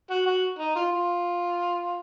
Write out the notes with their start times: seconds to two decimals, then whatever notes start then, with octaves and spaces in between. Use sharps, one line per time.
0.10 F#4
0.26 F#4
0.59 D#4
0.75 F4
0.92 F4